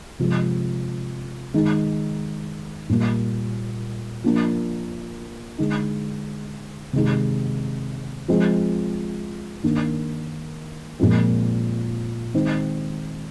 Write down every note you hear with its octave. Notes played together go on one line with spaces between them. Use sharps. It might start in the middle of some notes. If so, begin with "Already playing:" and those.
C3 F3 G#3
D#3 G#3 D#4
A#2 G3 A#3
F3 A#3 D4
D3 G#3 D#4
C3 D#3 G#3 D#4
F3 G#3 C4
D#3 A#3 D4
A#2 F3 G#3 C4
D#3 G#3 C4 D#4